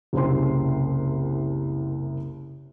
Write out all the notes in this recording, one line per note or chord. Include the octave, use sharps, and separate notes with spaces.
F#1 C2 C5 C6